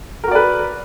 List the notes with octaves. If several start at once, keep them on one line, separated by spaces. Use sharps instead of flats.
F#4 A#4 B4 D5